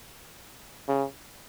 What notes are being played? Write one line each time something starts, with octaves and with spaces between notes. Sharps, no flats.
C#3